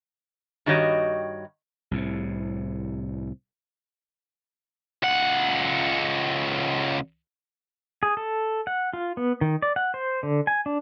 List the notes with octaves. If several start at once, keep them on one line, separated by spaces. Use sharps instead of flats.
G2 D#3 F#4 G4 C#5 D#5
C2 A2 C3
C#2 F#5
G#4
A4
F#5
F4
B3
D#3
D5
F#5
C5
D3
G#5
D4